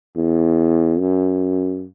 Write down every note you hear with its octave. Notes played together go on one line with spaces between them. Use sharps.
E2
F#2